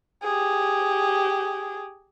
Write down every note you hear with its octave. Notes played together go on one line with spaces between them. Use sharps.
G4 G#4